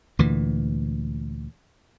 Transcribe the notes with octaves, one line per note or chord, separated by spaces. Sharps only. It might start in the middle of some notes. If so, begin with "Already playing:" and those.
D2 A#2 E3